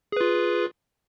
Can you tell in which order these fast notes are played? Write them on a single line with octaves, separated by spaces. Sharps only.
G#4 B4 F4